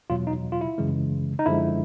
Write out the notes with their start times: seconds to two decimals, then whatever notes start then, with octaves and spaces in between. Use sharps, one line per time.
0.10 E2 B2 F#3 F4
0.27 D#4
0.52 F4
0.61 E4
0.78 F#2 C#3 E3 G#3
1.39 D#4
1.46 F#2 D3 F3 G#3 E4